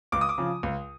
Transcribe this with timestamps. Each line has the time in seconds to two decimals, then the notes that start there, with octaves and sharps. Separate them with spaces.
0.12 C#2 D6
0.21 D#6
0.29 D6
0.38 C#3 F3
0.63 C#2